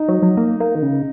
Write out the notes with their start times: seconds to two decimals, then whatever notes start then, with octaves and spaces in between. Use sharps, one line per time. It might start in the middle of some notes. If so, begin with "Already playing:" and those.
Already playing: D#4
0.08 F#3
0.23 F#3
0.37 A#3
0.60 A#3
0.75 D#3
0.82 C#3